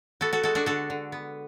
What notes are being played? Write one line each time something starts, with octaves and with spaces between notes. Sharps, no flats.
B3 F#4 A4
F#4 A4
G#3 F#4 A4
D4 F#4
D3 F#4 A4
D3
B3